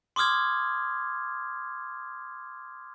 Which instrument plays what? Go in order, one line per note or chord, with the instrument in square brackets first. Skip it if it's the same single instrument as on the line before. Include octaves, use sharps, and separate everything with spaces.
[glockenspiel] C6 D6 D#6 F6 G#6